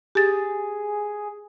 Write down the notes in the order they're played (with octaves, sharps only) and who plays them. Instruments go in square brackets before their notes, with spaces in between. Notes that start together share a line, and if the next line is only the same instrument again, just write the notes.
[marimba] G4 A6 [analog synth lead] G#4